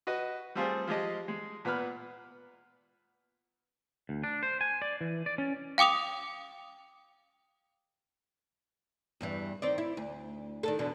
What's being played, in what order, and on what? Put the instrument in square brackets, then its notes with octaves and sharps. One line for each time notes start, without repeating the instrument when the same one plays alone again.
[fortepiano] F#4 B4 D#5
G3 A3 C4 F4 G#4 C5
F3 G#3 G4 D#5
G#3
A#2 B3 B4 B5 F6
[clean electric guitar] D2
D4
C5
G#5
D5
E3
D5
C#4
[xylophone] F5 G5 D6 D#6 F7
[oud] E2 G2 E3
D#3 C4 D5
E4
D2
D#3 D4 A4
E2 B2 D3